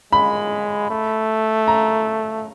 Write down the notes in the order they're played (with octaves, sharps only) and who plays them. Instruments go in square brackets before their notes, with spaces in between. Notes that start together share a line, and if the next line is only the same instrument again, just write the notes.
[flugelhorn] G#3 [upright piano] B5
[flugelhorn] A3
[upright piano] A#5